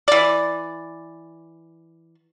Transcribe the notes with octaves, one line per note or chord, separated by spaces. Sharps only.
E3 D5